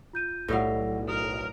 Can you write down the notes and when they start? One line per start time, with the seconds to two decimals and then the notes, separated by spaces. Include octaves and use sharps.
0.13 F4 G6 D#7
0.48 B1 A2 G3 F5 F#5 E6 A#6
1.08 A#4 D#6